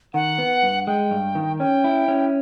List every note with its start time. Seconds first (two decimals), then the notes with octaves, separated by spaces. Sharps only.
0.14 D#3 F#5
0.38 B3
0.63 G2
0.87 G#3 G5
1.11 G2
1.35 D#3
1.60 C#4 G5
1.84 E4
2.08 C#4